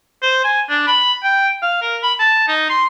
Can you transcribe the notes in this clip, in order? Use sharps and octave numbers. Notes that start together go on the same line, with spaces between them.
C5
G#5
D4
B5
G5
F5
A#4
B5
A5
D#4
C6